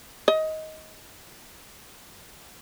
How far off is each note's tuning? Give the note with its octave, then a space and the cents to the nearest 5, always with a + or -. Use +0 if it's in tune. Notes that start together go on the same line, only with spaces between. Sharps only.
D#5 +15